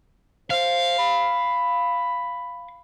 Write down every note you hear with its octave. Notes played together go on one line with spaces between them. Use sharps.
C5 F5
B5